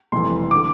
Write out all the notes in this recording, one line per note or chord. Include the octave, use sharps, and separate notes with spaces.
F1 F2 E3 G3 C6
D3 D6